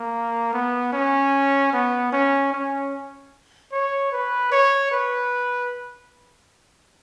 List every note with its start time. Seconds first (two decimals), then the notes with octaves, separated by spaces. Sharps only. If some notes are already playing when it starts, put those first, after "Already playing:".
Already playing: A#3
0.53 B3
0.93 C#4
1.73 B3
2.12 C#4
2.52 C#4
3.72 C#5
4.12 B4
4.52 C#5
4.92 B4